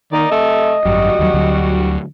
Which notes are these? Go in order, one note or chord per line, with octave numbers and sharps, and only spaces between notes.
D#3 A#3 D#4 D5
C3 A3 D#5
G#1 F#2 G3 F#4
D#2 D#3 F#3
D2 D3 F#3